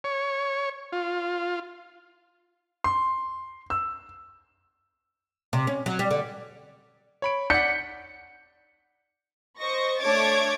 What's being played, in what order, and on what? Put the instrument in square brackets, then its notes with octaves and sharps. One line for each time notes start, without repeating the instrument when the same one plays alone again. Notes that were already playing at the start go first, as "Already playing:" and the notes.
[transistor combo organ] C#5
F4
[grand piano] C6
E6
[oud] C3
C#4
F#3
G3
D3
[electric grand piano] C#5 B5 D7
[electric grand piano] D5 F#5 [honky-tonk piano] G6 B6 C#7
[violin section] C5 D#5 C#6 A#6
A3 D4 C#5 D6 G#6 A6